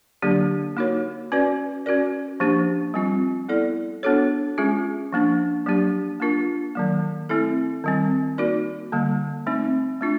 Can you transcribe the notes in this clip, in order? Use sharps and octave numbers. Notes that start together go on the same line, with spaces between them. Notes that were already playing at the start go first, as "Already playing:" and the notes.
D3 F#3 A#3 D4 G4
A#3 D#4 F#4 A#4 C#5
C#4 F#4 B4 D5
C#4 F#4 A#4 D5
F3 A#3 D4 G4
G3 C4 F4
B3 E4 A4 D5
B3 D4 F#4 A4 C#5
G#3 C#4 F4 G#4
F3 A#3 D4
F#3 A#3 D4 G4
A#3 D4 F4 A#4
D#3 F#3 A#3
A3 C4 E4 A4
D#3 G3 C4
A#3 D#4 F#4 A#4 D5
D3 G3 A#3
A3 C4 D#4
A3 D4 F4